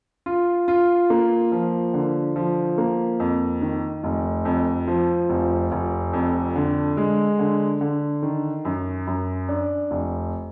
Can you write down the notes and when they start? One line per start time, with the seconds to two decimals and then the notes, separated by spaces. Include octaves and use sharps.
0.26 F4
0.68 F4
1.10 A#3
1.52 F3
1.94 D3
2.36 F3
2.78 A#3
3.20 F2
3.62 D#3
4.04 F1
4.45 F2
4.87 F3
5.29 F1
5.72 F1
6.13 F2
6.56 D3
6.97 G#3
7.39 D3
7.81 D3
8.23 D#3
8.65 F#2
9.07 F#2
9.49 D4
9.91 F1